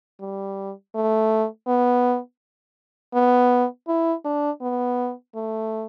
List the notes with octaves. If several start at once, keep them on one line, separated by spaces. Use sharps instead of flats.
G3
A3
B3
B3
E4
D4
B3
A3